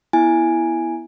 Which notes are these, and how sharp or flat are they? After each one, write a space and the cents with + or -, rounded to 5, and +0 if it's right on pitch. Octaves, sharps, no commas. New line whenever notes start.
B3 +0 E4 +0 G#5 +0